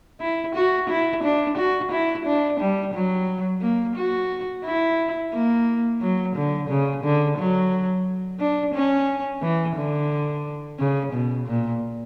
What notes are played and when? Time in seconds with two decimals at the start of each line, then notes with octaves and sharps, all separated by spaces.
0.20 E4
0.55 F#4
0.89 E4
1.23 D4
1.58 F#4
1.92 E4
2.26 D4
2.60 G3
2.94 F#3
3.62 A#3
3.96 F#4
4.65 E4
5.33 A#3
6.01 F#3
6.36 D3
6.69 C#3
7.04 D3
7.38 F#3
8.40 D4
8.74 C#4
9.42 E3
9.77 D3
10.79 C#3
11.12 B2
11.46 A#2